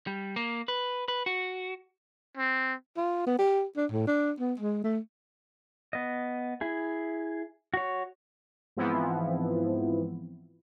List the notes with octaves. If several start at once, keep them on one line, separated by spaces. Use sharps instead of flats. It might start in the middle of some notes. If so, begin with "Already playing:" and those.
G3
A#3
B4
B4
F#4
C4
F4
B3
G4
D4
A2
D4
B3
G#3
A3
B3 D#5
E4 G#4
F#4 C#5
G#2 E3 F3 B3 C4 E4